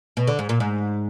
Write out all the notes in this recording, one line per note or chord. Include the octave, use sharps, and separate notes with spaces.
B2
D3
G#2
A#2
G#2